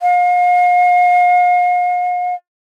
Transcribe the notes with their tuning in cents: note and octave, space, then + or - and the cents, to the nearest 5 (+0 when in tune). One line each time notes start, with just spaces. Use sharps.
F5 +40